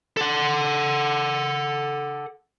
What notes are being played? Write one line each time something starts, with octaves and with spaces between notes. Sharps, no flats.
A4 F#5